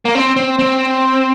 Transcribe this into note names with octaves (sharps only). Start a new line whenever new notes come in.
A#3
C4
C4
C4